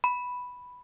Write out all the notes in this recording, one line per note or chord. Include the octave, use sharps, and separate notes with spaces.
B5